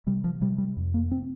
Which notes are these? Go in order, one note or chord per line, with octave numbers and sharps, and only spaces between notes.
C3 G3
F3
C3 G3
G3
F2
A#3
C4